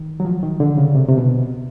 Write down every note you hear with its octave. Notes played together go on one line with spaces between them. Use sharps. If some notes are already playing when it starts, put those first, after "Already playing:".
Already playing: D#3
F#3
F3
D#3
D3
C#3
C3
C3
B2